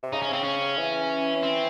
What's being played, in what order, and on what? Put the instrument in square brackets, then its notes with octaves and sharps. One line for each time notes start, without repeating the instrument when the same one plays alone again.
[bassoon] C3
[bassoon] C#3 [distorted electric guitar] D#4
[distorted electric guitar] C#4
C4
C#4
[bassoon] E3
[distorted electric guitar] C4